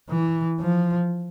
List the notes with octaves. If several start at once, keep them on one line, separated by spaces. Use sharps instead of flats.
E3
F3